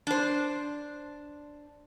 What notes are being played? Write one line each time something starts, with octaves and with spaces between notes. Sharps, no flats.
D4 C5